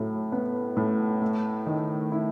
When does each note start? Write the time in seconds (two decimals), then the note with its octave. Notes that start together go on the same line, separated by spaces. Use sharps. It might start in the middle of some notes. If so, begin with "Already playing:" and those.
Already playing: A2 F#3
0.32 B3
0.77 A2
1.22 A3
1.66 D#3
2.12 E4